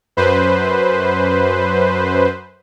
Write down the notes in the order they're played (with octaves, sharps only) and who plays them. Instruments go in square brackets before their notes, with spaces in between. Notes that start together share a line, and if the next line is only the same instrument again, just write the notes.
[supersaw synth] F#2 B4 C5